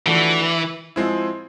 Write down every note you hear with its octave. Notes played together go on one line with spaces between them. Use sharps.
E3 F3 A3 D4 F#4
F3 G#3 C4 E4